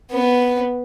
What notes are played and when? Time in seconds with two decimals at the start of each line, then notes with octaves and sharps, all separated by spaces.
0.11 B3